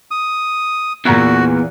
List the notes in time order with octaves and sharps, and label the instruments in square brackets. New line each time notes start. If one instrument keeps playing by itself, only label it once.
[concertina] D#6
[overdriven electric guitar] E2 [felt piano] A#2 A#5 F#6 [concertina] F#4